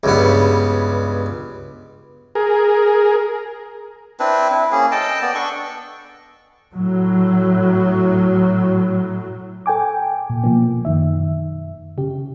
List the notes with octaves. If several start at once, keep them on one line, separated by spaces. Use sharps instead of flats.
C#2 G2 B3
G#4 A#4
C4 D4 E4 B4
E4
A#3 C#4 G#4
A4 D#5 G5 A5
B3 D5
D4 A4 C#6
A2 F#3
A4 G5 G#5 D6
A#2
B2 F3 A#3
F#2 D#3 E5
C#3 G4